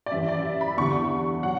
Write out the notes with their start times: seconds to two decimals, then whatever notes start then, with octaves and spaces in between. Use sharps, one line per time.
0.06 D5
0.11 F#2 E3 G3 E5
0.28 D5
0.45 E5
0.61 B5
0.77 E2 D3 G3 C#6
1.43 F#3 F#5